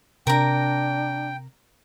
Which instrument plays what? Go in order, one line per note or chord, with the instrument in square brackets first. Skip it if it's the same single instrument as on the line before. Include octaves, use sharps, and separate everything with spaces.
[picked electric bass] C3 [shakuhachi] D4 [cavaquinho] A#4 A#5 [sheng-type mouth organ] G5